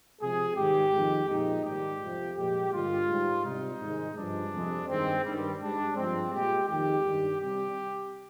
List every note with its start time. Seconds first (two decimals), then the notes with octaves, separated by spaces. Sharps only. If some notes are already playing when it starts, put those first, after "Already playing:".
0.21 C3 F3 G#3 G#4
0.57 G#2 D#3 G3 G4
0.94 F2 D#3 G#3
1.29 A#2 F3 G#3 D#4
1.65 G#2 D#3 G3 G4
2.01 F2 C3 F3
2.37 A#2 F3 G#3 G4
2.73 G2 D3 G#3 F4
3.09 G#2 G3
3.44 C3 G3 D#4
3.80 G#2 D#3 G#3
4.16 G2 F3 G#3 D4
4.53 F2 C3 F3 G#3
4.88 G2 D#3 G#3 C4
5.25 G2 D#3 G3
5.61 G#2 G3 D4
5.96 G2 F3 G#3 C4
6.32 A#2 G#3 G4
6.68 F2 D#3 G#3 G4
7.05 G2 D#3 G3
7.40 C3 G3 G4